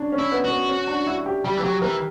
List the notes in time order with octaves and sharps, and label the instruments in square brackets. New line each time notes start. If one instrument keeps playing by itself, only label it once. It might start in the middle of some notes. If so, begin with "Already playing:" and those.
Already playing: [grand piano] C#4 D4
C#4
[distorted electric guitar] E4
[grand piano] B3
[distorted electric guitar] F#4
[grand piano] B3
C#4
D4
E4
G4
[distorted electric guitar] G3 [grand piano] G4
[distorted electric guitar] E3
[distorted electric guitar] F#3 [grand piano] G4
[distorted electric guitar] E3 [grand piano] A#4